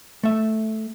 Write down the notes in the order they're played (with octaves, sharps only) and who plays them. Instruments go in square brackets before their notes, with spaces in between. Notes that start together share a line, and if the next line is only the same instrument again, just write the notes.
[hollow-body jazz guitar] A3 E5